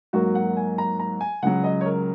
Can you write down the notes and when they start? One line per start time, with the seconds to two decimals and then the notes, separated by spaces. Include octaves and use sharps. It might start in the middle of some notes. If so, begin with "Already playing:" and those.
0.13 G#2 F#3 A#3 F#4
0.35 F#5
0.57 G#5
0.78 A#5
0.99 A#5
1.21 G#5
1.42 C#2 C#3 F#3 F#5
1.64 D#5
1.81 C#5
1.86 A#4